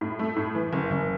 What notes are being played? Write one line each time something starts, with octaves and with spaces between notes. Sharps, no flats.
A2
A3
A2
E3
F#1
F#1